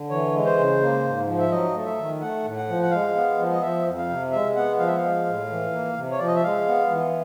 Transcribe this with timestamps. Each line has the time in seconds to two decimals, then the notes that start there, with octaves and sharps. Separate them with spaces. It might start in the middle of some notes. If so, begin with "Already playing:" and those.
Already playing: D3
0.10 E3 C#5
0.34 G#3
0.45 C5
0.57 C#3
0.81 A#3
1.04 G#2
1.27 F3
1.39 E5
1.51 F#3 D#5
1.75 A3
1.86 E5
1.98 D#3
2.21 A3 F#5
2.44 A2
2.56 F#5
2.69 F3
2.83 F#5
2.91 G#3 F5
3.15 B3
3.38 F3
3.51 D#5
3.61 F3 E5
3.86 F2
3.98 F5
4.09 C3
4.32 G#3 E5
4.56 B3 F#5
4.79 F3 F5
4.87 E5
4.97 F5
5.02 G#3
5.26 A2
5.50 E3
5.73 A#3
5.96 C3
6.11 C#5
6.19 F3 D5
6.27 D#5
6.35 E5
6.43 G#3 F5
6.67 B3
6.90 E3